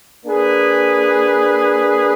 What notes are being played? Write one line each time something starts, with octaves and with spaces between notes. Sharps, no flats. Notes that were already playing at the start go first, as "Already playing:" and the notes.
A#3 D4 G#4 B4